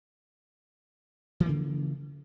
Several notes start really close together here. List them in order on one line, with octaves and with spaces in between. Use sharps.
E3 F3 A#3 C#3